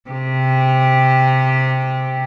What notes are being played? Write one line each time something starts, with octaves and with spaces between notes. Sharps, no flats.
C3 G4